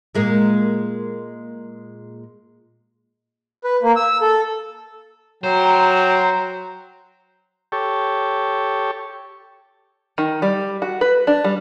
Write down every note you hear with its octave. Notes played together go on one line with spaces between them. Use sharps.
A#2 G#3 A#3
B4
A#3
E6
A4
F#3 C5 G5 A#5
G4 A4 C#5
D#3
G3
F#4
B4
D4
G3